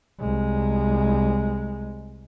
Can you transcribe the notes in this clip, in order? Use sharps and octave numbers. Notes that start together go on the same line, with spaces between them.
C2 G#3